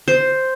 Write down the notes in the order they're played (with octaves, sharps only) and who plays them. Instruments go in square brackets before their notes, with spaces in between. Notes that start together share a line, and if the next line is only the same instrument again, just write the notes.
[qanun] C5